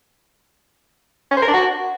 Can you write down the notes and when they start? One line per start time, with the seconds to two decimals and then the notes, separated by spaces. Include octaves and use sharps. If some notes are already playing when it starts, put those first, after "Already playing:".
1.31 C#4
1.37 C5
1.43 A#4
1.48 D4
1.54 F#4